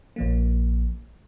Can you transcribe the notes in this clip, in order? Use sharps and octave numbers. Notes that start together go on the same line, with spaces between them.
A#1 F3 A#3